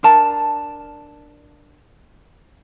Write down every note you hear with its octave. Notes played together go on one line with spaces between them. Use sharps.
D4 A#4 A5 A#5